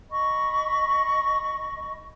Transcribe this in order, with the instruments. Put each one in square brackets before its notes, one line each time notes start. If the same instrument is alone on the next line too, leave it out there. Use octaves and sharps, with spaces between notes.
[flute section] D#5 B5 C#6